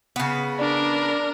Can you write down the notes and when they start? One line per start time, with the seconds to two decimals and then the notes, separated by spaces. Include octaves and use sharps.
0.16 C#3 B3
0.59 D4 A#4 D5